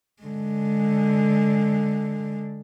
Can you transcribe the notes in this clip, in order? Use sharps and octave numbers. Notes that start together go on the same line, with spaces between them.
D3 G#3